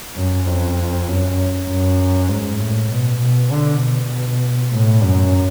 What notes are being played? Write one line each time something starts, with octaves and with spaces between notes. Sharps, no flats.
F#2
F2
F#2
F#2
G#2
A2
B2
B2
D3
B2
A2
F#2